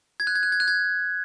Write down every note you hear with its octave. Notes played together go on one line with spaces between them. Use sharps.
G#6
F#6
G#6
F#6
G#6
F#6
G#6